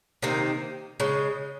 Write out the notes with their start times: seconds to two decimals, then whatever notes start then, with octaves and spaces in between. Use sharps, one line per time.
0.22 C3 D#3 A#3
1.00 C#3 G#3